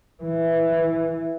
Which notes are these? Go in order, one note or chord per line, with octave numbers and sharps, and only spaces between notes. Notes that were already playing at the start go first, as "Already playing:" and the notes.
E3